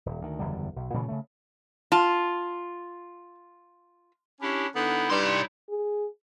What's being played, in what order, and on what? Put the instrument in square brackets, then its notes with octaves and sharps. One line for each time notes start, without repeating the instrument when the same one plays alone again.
[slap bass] D#1
D2 D#3
F#1 E2 D3 G3
B1
A#2 C#3 E3 A3
C#3 A3
[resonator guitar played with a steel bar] F4 [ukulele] A5
[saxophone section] C#4 [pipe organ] D4 E4 G4
[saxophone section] D3 B3 [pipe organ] D#4 E4
[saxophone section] G2 [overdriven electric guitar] D5 C6
[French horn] G#4